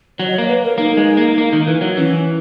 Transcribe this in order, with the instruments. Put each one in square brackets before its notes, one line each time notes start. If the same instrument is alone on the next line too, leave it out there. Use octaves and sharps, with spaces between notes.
[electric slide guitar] F#3 [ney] C#5
[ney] D#5
[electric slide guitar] A#3 [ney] C#5
[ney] B4
A#4
[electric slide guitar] A#3 [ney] D#4
[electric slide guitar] G#3
A#3
A#3
D#3
E3
F#3
[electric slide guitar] E3 [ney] C#4